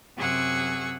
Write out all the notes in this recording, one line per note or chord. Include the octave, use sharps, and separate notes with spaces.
F#2 C3 G#4 F#5 C#6 E6